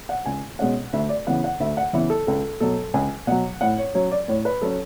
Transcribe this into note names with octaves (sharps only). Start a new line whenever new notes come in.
F#5
C#2 G#5
B2 G#3 C#4 F#5
D2 E5
D5
C#3 E3 B3 F#5
F#5
D2 E5
F#5
C#3 E3 B3 E5
A4
C#2 A4
B2 F#3 A4
C#2 G#5
B2 F#3 F#5
A2 F#5
C#5
F#3 C#4 C#5
D5
A2 C#5
B4
F#3 C#4 A4